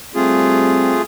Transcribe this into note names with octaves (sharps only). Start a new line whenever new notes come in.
G3 A3 C4 F4 G#4